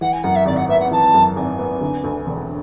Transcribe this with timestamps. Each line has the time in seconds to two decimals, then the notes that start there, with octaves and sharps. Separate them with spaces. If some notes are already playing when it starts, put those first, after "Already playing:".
0.01 E3 F#5
0.13 G#5
0.23 F#2 F#5
0.36 E5
0.46 G#1 D5
0.57 F#5
0.69 B3 E5
0.80 F#5
0.91 E3 A5
1.14 F#2
1.36 G#1 G#5
1.59 B3
1.81 D3
2.04 D2
2.27 E1